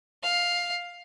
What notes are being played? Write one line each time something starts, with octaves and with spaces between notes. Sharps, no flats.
F5